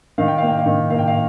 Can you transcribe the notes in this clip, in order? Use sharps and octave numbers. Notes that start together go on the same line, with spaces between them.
D#3 F5
G5
A#3 F5
G5
F5
D#3
A#3 F5
G5
F5